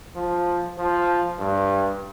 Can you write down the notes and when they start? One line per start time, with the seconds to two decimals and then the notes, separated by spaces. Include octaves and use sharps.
0.16 F3
0.78 F3
1.39 G2